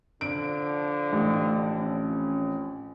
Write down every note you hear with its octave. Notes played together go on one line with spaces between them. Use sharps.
D3 F3 D4 D7
A1
F2 C#4